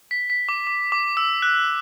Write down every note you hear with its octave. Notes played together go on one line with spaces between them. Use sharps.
B6
B6
D6
D6
D6
E6
F#6